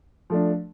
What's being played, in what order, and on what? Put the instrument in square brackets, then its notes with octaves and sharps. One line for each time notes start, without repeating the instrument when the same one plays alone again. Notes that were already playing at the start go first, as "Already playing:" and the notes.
[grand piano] F3 A3 D4